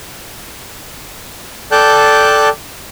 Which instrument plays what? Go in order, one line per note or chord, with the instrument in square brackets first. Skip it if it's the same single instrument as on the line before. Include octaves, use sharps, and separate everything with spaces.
[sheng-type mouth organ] A4 D5 G5 A5 F#6 G6